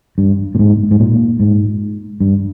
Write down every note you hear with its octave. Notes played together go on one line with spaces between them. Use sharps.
G2
A#2
G#2
G#2
A#2
G#2
G2